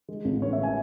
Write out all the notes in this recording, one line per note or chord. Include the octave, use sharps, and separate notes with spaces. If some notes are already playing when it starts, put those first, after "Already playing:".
G#3
A1
B3 C#5
E5
G#5